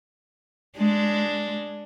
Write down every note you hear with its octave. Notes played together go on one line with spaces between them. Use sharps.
G#3 D4